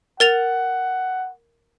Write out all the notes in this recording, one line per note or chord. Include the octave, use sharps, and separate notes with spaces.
A#4 F#5 A6 F7